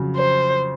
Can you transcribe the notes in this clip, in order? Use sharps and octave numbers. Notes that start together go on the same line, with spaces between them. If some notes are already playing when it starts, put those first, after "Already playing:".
Already playing: F2 C#3 F#3
C5